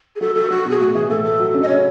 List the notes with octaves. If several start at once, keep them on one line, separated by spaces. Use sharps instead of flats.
G#4
F#3 A4
F#3 A4
F#3 F#4
B2 G#4
A2 F#4
E3 G#4
A2 A4
A3 A4
F#3
C#4
D#5
C#3 C#5